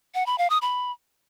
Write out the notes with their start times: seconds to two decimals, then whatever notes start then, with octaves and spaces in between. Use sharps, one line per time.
0.15 F#5
0.26 B5
0.38 F5
0.50 D#6
0.62 B5